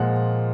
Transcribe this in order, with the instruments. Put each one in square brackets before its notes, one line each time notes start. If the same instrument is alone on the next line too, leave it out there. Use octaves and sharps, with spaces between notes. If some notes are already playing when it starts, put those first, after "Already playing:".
Already playing: [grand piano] A#2 F3 G#3 F5 F#5